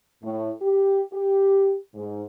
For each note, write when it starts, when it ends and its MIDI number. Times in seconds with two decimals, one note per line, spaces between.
0.23 0.50 45
0.62 1.01 67
1.13 1.77 67
1.95 2.24 44